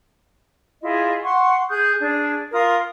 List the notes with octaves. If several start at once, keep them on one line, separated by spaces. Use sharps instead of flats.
E4 F4 G#4 D#5
F#5 C6 C#6
G#4 D#6 F#6 G6
D4 G#4
F4 A#4 D#6